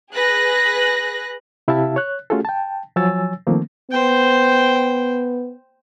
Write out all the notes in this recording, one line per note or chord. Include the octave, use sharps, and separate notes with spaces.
G#4 B4 F#6 A#6
C3 E4 G4 E5 F5 A5
C#5 F#6
A3 C#4 F4 F#4 G#4 A4
G5 A5
F3 F#3 C#5 G#5 E6 A6
D#3 F3 A3 A#3 C4
B3 C5 G5